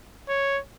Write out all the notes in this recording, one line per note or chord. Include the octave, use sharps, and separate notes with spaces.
C#5